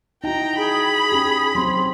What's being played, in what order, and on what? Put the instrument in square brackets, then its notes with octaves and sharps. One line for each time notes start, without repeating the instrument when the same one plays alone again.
[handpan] D#4 E4 F#4 [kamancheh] G5 A#5
[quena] G#4 [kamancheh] B5
[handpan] C#4 G4
[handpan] F#3 C4 [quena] C6